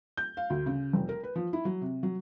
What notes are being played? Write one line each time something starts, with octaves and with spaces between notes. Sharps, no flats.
G6
F5
D2
C#3
F1
A#4
B4
F3
E4
F#3
C3
F#3